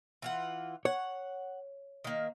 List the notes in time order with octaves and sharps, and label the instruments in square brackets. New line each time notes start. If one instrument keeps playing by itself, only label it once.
[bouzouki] E3 F4 F#5
[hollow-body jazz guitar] C#5 [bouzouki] F#5
[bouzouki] D#3 A#3